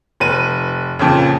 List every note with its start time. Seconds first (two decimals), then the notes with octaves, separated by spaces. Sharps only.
0.20 F1 B4 D#7
0.99 F2 A#2 C#3